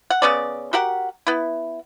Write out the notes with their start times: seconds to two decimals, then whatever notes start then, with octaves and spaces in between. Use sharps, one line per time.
0.10 F#5
0.22 C#3 B3 C#4 D5
0.73 F#4 G4 A#4 F#5
1.27 B3 E4